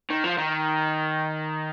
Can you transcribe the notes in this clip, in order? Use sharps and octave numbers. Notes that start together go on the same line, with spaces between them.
D#3
F3
D#3